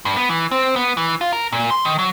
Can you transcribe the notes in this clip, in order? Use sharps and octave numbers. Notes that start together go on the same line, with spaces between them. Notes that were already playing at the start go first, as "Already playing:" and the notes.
G2
B3
E3
C4
B3
E3
F4
A#4
A#2
C6
D#3
F#3